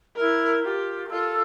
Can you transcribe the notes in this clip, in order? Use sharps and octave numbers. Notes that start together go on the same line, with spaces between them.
E4 A#4
F4 G4
A#4
F4 A4